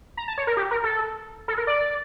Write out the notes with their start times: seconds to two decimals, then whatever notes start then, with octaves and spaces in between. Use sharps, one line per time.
0.17 A#5
0.28 A5
0.38 C#5
0.47 A#4
0.57 G4
0.71 A#4
0.84 A4
1.48 A4
1.57 A#4
1.67 D5